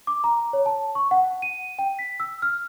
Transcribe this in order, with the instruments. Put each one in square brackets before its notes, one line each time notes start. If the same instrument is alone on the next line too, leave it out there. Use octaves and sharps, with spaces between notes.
[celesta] D6
A#5
C#5
A5
C#6
F#5
D#7
G5
B6
E6
F6